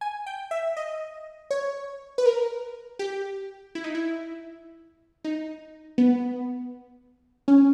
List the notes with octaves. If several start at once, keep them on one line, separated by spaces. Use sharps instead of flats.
G#5
G5
E5
D#5
C#5
B4
A#4
G4
E4
D#4
E4
D#4
B3
C#4